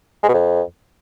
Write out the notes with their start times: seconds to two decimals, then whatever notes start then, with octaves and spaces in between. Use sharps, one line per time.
0.23 G#3
0.28 B2
0.34 F2